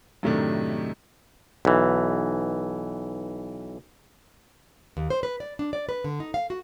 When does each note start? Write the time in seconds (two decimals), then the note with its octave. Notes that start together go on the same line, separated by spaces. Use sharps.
0.23 F#2 A2 C3 D#3 A3 D4
1.65 B1 E3
4.97 D#2
5.10 C5
5.23 B4
5.40 D5
5.59 D4
5.73 D5
5.89 B4
6.04 D3
6.20 D#4
6.34 F5
6.50 F#4